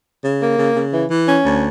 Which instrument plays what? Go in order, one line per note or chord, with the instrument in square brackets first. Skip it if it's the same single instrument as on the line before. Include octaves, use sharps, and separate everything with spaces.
[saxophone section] C#3
A#3
C#3
C#3
E3
E3
C#4
D2